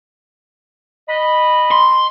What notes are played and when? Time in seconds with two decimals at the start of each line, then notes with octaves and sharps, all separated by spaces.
1.09 D#5 B5
1.71 C6